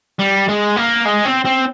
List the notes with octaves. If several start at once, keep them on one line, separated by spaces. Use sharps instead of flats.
G3
G#3
A#3
G#3
C4
C4